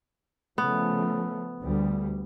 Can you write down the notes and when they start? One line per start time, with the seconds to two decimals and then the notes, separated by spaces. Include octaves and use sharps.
0.58 C#3 F3 A3 B3
1.61 D2 G3